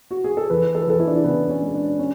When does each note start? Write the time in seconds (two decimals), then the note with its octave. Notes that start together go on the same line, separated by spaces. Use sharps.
0.11 F#4
0.24 G#4
0.37 A4
0.50 E2 B4
0.75 A4
0.82 B4
0.87 E2 A4
1.00 E4
1.07 D4
1.15 E4
1.24 C#3 B3
1.49 C#4
1.62 G#3
1.74 D4
1.99 C#4